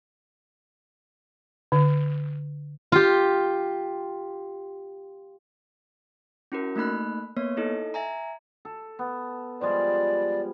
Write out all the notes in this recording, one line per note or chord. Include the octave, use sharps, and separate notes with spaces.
D3
F4 G4
C#4 E4 F#4 A#4
A3 A#3 D#4 B5 F#6
A#3 B3 C#5
D#4 E4 A4 D#5
E5 G#5 A#5
A4
B3
F3 G3 G#3 D5